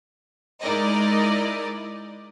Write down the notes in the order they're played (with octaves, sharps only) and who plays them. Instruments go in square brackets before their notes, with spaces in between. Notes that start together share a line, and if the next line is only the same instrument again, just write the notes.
[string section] G#3 D#4 E4 A#4 D5 D#5